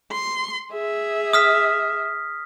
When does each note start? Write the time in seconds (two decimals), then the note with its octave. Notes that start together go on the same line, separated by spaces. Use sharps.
0.12 C6
0.72 G#4 E5
1.33 D#6 F6 B6